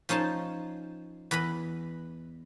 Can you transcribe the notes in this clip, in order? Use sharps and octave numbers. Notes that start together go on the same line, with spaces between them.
F3 C#4 D#4 C5 A5
E2 B4 D#5 B5